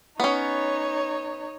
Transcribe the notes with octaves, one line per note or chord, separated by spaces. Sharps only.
B3 C#4 D#4 C#5